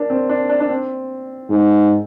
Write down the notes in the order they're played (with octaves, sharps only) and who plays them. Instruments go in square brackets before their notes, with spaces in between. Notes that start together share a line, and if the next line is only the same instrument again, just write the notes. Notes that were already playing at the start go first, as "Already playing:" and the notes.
Already playing: [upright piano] A#3 D4
C4
D4
D4
D4
C4
[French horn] G#2